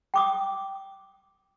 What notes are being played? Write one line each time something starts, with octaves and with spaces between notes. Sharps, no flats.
G5 D6 D#6